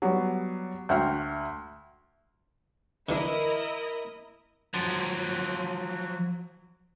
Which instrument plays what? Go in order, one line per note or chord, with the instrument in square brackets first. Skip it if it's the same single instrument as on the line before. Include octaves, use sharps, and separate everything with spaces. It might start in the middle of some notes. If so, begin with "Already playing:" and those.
[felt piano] F#3 G3 B3
D2 F#4 G5 F6
[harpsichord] D3 E3 D4 [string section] E4 A#4 D#5
[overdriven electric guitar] F3 F#3